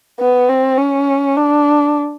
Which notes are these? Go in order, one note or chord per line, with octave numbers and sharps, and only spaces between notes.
B3
C4
C#4
D4